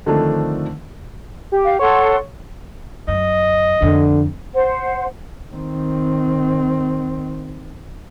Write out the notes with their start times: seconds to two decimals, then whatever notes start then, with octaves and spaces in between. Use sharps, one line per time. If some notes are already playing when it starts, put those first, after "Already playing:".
0.06 D3 D#3 F3 A3 C4 D4
1.52 G4
1.65 F5
1.79 A4 C#5 F#5 C6
3.08 F#2 D#5
3.82 F2 D3
4.54 C5 F#5
5.51 D#3 C4